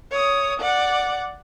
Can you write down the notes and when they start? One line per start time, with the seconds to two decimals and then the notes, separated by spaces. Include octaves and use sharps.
0.11 C#5 D#6
0.60 D5 F#5